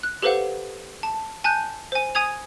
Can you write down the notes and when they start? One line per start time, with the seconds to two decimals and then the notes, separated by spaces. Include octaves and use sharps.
0.03 F#6
0.22 G4 A4 B4 C5 F5 F#5
1.03 A5
1.44 G#5 A5 F#6 G6
1.92 C5 G#5
2.15 G#5 D#6 G#6 F7